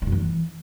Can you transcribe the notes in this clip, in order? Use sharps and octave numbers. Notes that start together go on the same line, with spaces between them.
D#3
F#2
E3